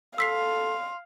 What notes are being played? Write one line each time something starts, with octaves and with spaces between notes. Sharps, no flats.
A4 F5 C6 E6 B6 C7